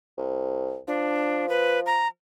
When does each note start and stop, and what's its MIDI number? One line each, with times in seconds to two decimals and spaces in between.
0.18 0.78 36
0.88 2.07 53
0.88 1.48 62
1.49 1.80 71
1.86 2.07 82